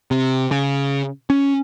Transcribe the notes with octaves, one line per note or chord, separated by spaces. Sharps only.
C3
C#3
C#4